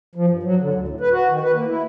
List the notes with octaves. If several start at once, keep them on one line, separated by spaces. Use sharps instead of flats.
F3
G2
F#3
D3
D2
A2
B4
F#4
D#3
B4
A#3
E4